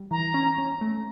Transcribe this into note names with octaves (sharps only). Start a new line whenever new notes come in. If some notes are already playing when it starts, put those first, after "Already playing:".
Already playing: G3
E3 A#5
C#4
C#4
A3